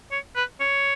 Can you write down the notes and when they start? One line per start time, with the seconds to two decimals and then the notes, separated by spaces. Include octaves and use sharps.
0.12 C#5
0.36 B4
0.60 C#5